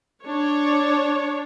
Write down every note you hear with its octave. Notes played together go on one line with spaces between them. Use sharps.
D4 C#5